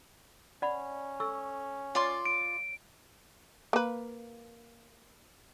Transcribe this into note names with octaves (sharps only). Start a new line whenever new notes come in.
C#4 D5 F#5 B5
A4 C#6 E6
F4 C#5 D5 C6 D6
D7
A#3 B4